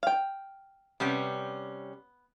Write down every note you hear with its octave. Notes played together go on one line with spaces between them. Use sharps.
F5 G5
C3 G3 B3 C#4